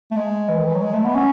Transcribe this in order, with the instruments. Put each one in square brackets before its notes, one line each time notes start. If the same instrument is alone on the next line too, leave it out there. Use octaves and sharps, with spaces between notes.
[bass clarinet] A3
G#3
E3
D#3
E3
F#3
G#3
A3
B3
C#4